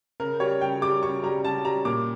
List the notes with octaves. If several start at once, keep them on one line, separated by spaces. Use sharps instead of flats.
C#3 A#4
G3 C#5
C#3 G5
G3 D6
C#3 C#6
G3 A#5
C#3 A5
G3 A#5
A#2 D6